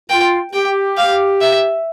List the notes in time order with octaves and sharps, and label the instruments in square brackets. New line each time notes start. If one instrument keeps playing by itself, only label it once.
[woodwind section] F4 [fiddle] G5
[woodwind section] G4 [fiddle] G5
[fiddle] F5
E5